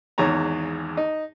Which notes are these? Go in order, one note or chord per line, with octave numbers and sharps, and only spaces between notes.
G#1 E2 G#2 C#5 A#5
D#4